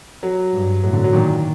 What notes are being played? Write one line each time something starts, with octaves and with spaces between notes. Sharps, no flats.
F#3
G2
A2 F#3
D3
F#3
A#2 D#3